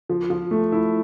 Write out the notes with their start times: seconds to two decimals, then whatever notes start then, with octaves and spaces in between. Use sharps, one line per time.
0.09 F3
0.30 F3
0.51 A3
0.72 E4